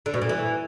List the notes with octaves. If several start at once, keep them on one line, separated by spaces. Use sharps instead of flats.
D3
B2
A#2
E3